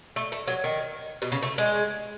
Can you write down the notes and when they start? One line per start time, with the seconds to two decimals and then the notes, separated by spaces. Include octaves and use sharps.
0.16 A3
0.32 A3
0.47 F#3
0.64 D#3
1.22 B2
1.32 C#3
1.43 A3
1.58 G#3